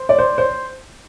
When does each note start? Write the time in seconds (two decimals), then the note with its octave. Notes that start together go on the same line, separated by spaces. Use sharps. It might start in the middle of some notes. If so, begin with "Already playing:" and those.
Already playing: C5
0.09 D5
0.19 C5
0.38 C5